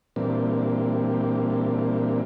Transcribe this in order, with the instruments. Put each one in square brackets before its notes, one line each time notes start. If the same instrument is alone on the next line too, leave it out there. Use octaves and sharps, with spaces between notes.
[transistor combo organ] A#2 E3 G3 A#3 C4 D4